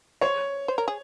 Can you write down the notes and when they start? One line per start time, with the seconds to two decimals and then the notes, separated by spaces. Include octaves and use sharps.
0.21 C5 C#5
0.68 C5
0.78 A#4
0.88 G#4